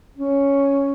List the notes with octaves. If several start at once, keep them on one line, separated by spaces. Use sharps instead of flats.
C#4